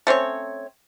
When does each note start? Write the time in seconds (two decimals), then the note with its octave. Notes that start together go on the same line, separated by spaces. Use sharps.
0.07 A3 C4 C#4 C#5